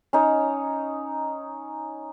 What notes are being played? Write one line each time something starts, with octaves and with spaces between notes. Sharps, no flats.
C#4 D#4 C#5